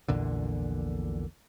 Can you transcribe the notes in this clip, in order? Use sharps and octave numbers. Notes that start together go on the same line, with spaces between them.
A#1 E2 A#2 D3